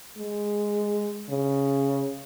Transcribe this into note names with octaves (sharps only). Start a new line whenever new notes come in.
G#3
C#3